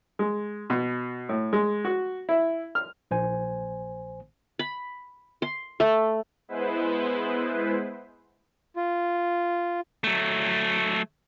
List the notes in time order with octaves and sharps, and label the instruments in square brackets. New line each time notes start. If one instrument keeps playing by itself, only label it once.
[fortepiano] G#3
B2
A2
G#3
F#4
E4
F6
[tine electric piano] A#1 C5 G#5
[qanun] B5
C6
A3
[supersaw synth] G#3 B3 E4 B4 C5
[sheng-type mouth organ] F4
[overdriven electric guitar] F#3 A3